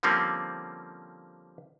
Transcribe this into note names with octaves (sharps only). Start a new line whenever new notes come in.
D3 F3 G3 A#3 C4 C#4